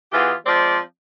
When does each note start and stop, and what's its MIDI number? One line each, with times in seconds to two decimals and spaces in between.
0.12 0.33 52
0.12 0.33 59
0.12 0.33 65
0.12 0.33 67
0.12 0.33 68
0.44 0.78 53
0.44 0.78 56
0.44 0.78 60
0.44 0.78 74